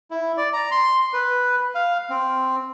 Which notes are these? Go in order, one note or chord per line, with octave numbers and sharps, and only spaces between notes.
E4
D5
A#5
C6
B4
F5
C4